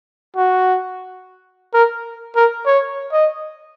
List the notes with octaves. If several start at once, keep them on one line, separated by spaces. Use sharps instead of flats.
F#4
A#4
A#4
C#5
D#5